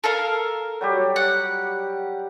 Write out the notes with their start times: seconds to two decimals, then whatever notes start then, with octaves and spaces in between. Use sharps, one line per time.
0.04 A4 A#4 F5
0.81 F#3 G3 G4
1.16 F#5